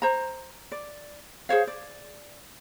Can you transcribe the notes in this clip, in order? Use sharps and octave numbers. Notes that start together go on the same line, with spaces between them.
C5 A#5
D5
G#4 C5 C#5 F5
D5